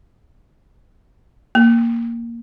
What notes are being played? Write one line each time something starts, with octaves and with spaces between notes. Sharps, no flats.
A#3